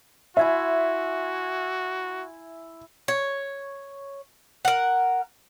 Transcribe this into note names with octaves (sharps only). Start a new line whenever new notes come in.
E4 F#4 E5 G#5 C6
C#5
A#4 F#5